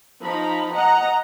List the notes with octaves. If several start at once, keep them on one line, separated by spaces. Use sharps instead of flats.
F3 D#4 A#5 B5
D#5 F#5 A#5